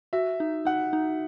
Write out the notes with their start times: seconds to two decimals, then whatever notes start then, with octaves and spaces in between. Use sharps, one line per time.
0.13 F#4 E5
0.40 D#4
0.65 D#4 F#5
0.93 D#4